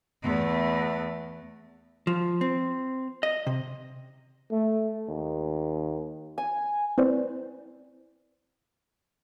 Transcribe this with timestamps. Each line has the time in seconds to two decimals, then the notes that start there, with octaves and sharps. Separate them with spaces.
0.22 E2 A3
2.07 F3
2.41 C4
3.23 D#5
3.47 C3
4.51 A3
5.08 D#2
6.38 G#5
6.98 C4 E4 B4 C5 D5